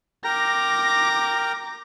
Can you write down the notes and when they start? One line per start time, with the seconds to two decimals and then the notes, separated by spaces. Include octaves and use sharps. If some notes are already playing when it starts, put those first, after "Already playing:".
0.25 A#4 G5 A#5 D6 A#6